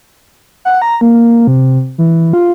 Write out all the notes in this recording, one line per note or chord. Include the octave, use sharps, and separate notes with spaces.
F#5
A#5
A#3
C3
E3
F4